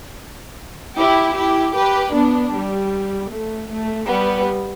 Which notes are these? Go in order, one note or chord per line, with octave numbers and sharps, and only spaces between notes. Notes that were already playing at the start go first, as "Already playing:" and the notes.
E4 G4
E4 G4
G4 B4
B3 D4
G3
A3
A3
G3 B3